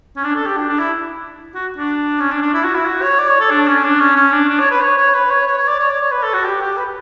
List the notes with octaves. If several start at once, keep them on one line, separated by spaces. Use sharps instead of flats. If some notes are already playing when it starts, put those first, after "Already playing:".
C#4
D4
A4
G4
D4
D4
E4
F#4
D4
C#4
D4
D4
E4
F#4
E4
F#4
C#5
D5
C#5
A4
D4
C#4
D4
C#4
C#4
D4
D4
C#5
B4
C#5
C#5
B4
C#5
C#5
C#5
D5
C#5
D5
C#5
B4
A4
F#4
G4
G4
B4